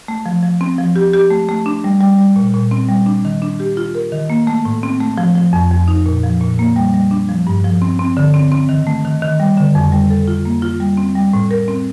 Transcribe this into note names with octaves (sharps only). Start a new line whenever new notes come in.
A3
F3
F3
C4
F3
G4
G4
A3
A3
D4
G3
G3
G3
A#2
A#2
C4
G3
D4
D#3
D4
G4
F4
A#4
D#3
A#3
A3
A2
C4
A3
F3
F3
F2
F2
D#4
A#2
F3
A#2
A#3
G3
G3
D4
F3
G2
F3
C4
C4
D3
C4
C4
D#3
A3
D#3
D#3
G3
D3
F2
G3
A4
F4
A#3
F4
G3
C4
G3
A2
A#4
C4